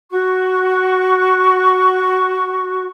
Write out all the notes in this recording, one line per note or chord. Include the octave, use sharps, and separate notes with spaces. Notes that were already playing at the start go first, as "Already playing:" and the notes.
F#4 C#6